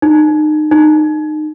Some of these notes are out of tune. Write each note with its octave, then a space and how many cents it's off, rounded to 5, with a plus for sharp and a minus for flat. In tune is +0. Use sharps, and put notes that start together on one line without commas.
D#4 -30
D#4 -25